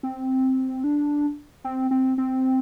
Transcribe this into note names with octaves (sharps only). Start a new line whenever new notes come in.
C4
D4
C4
C4
C4